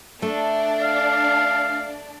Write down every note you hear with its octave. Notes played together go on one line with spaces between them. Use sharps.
A3 D4 D5
F5